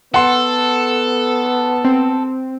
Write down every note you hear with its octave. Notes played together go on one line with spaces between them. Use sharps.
B3 A4 F#5 C6
C4